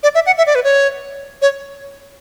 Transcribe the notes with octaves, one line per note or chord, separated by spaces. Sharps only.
D5
E5
F#5
E5
D5
B4
C#5
C#5